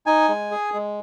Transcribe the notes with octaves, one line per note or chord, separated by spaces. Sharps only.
D#4 G#5
G#3
G#4
G#3